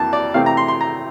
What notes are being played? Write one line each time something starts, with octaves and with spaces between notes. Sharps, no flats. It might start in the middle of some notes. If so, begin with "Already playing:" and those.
Already playing: F2 E3 A#3 A5
D5
C3 E3 A3 C4 F5
A#5
C6
C6
A#5